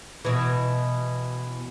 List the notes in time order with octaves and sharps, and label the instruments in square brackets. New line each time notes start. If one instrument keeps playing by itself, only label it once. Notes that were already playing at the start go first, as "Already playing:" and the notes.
[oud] B2 E3